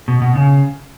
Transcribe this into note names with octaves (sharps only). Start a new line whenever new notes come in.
B2
B2
C#3